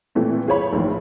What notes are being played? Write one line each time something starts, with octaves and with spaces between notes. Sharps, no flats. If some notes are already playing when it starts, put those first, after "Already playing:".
A#2 E3 G3 A3 C4
F4 G#4 C5 C#5 B5
A#1 A2 D#3